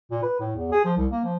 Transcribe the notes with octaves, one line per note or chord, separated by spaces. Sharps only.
A#2
B4
A2
E2
G#4
F3
C2
A#3
F3